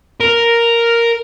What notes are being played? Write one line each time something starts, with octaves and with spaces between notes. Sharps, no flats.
A#4